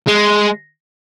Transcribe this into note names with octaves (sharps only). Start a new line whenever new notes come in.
G#3